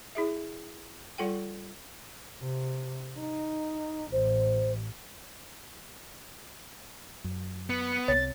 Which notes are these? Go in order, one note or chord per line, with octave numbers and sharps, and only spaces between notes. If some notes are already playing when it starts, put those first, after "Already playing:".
E4 G#4 E5
G3 F4 A4 F#5 G5
C3
D#4
A1 C5
F#2
B3
C2 C3 C#5 A6